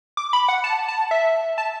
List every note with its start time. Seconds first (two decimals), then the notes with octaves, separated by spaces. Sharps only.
0.17 D6
0.33 B5
0.48 F#5
0.64 A5
0.88 A5
1.11 E5
1.58 A5